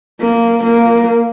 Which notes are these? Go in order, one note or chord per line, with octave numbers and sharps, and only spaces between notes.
A#3
A#3